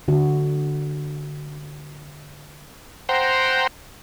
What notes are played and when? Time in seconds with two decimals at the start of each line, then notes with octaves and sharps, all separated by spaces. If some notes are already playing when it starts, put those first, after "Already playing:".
0.08 D3 F#4
3.09 C5 F#5 G5 A#5 C6